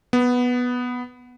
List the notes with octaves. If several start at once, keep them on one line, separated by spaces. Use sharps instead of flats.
B3